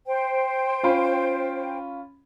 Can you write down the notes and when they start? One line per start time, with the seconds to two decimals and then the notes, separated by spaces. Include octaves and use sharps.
0.06 C5 G5
0.83 C#4 F4 B5